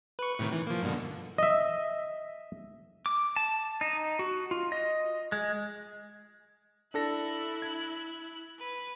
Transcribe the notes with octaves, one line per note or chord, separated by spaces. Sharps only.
B4 C#6
A2 C3 D#3
E3
F3 A#3
G2 B2 D3
D#5 E5
D6
A5
D#4
F#4
F4
D#5
G#3
D4 E4 A4 F#6 A#6
G#6
B4